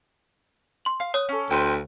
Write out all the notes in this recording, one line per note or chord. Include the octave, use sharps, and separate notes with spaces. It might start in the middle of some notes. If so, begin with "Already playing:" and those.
C6 F#7
F5
C#5 D#6 F#6
C#4 A4
D2 B4 C5 G5